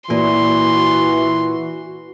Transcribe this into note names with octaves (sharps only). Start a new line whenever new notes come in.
A#2 E3 F#4 C6